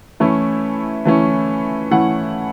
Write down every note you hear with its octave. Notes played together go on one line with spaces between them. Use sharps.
E3 A3 C#4 E4
E3 A3 C#4 E4
E3 A3 C#4 E4 F#5